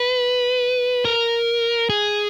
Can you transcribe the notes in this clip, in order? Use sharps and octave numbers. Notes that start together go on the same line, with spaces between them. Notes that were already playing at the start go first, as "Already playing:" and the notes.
Already playing: B4
A#4
G#4